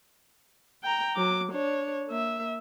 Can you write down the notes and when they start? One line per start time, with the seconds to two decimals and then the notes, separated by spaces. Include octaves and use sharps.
0.83 G5 A#5
1.16 F#3 D6
1.52 D4 C#5
2.07 A#3 E5